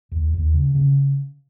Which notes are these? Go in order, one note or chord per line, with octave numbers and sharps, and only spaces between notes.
D#2
D#2
C#3
C#3